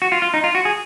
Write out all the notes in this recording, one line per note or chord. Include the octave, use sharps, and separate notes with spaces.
F#4
F4
F4
D#4
F4
F#4
G#4